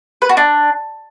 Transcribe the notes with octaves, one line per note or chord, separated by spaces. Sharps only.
B4
F#4
D4